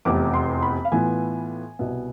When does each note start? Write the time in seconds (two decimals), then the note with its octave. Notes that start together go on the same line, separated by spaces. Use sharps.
0.05 F1 E2 C3 D6
0.34 C6
0.62 B5
0.85 F5
0.92 A2 E3 B3 F4 G#5
1.79 C2 B2 B3